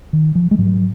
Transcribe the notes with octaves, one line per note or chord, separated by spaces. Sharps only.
D#3
F3
G#3
G#2 F#3